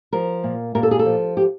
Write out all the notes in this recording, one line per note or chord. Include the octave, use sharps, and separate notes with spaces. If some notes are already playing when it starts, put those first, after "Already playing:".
F3 A#4
A#2
A#2 A#4
A4
G#4
A4
F3
G4